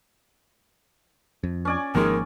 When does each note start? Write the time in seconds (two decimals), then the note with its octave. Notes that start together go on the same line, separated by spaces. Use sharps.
1.43 F2
1.65 C#4 D5 G#5
1.95 G#1 D#3 F3 G#3 A#3 A#4